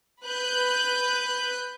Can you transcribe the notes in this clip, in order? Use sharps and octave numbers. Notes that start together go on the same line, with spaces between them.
B4 F#6 G6